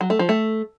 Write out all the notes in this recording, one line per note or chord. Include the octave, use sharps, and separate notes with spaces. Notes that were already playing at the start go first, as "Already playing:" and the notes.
F#3
A3
F3
A3